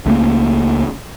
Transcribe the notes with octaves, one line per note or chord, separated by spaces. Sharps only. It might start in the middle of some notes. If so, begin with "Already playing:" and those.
C#2 A3 A#3